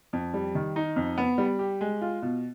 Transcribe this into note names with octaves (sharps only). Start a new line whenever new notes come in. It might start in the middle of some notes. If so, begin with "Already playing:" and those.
F2
G3
D#3
D#4
F2
B3
G3
G4
G#3
F4
B2